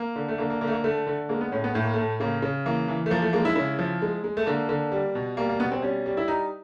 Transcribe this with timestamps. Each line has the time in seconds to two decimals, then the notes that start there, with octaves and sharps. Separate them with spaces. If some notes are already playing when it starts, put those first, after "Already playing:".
Already playing: A#3
0.16 D3
0.28 A3
0.38 D3 A#3
0.50 A#3
0.61 D3 A#3
0.67 A3
0.72 A#3
0.84 D3 A3
1.07 D3
1.29 G#3 A#3
1.41 B3
1.52 A2 C#4
1.64 B3
1.74 A2 A3
1.84 A#3
1.93 A2 A3
2.20 C#3 A#3
2.42 C#3
2.66 E3 A#3
2.88 E3
3.06 A3
3.10 F3 A#3
3.22 A3
3.33 G#3 A#3
3.45 E4
3.55 C#3 E4
3.79 F3
4.02 G#3
4.24 G#3
4.37 A3
4.46 D3 A#3
4.69 D3
4.92 G3
5.15 B2
5.37 G3 A#3
5.49 A#3
5.60 B2 B3
5.71 C4
5.82 G3 C#4
6.06 G3
6.17 E4
6.28 G3 D#4